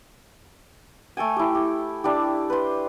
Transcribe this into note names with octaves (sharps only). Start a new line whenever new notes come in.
A3 A4 G5 G#5
E4 G4
G4
D4 E4 G4
B4 C6